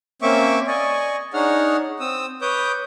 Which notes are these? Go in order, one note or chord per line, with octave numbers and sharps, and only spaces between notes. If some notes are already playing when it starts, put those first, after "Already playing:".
A#3 C4 C#4 E5 C#6 D6
D5 D#5 G#5 C#6
D4 D#4 G#4 C#5 F#5 F6
C4 D#6 E6
B4 C#5 D6 D#6 G6